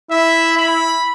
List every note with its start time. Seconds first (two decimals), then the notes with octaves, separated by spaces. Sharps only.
0.11 E4 E5
0.57 B5